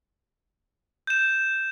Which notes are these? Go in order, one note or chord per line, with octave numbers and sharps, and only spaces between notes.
G6 E7